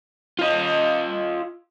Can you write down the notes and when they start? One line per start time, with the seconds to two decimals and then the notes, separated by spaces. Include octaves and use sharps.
0.39 F4 D#5